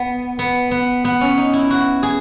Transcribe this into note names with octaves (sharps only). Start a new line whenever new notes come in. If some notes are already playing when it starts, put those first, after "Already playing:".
Already playing: B3
B3
B3
B3
C#4
D#4
E4
F#4
G#4